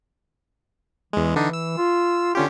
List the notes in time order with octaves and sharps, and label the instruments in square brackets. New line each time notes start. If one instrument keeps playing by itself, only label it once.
[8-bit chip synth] E2 G#3 [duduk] E3
[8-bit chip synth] D3 D4 D#4
E6
[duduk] F4
[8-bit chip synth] D3 C#4 G4 [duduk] F4